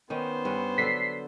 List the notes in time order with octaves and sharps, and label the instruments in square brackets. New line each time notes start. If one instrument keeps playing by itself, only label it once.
[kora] D#3 C#4 [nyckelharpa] B3 C5
[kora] G2 C#4 F#5
[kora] D3 F#3 A4 [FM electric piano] B6 C7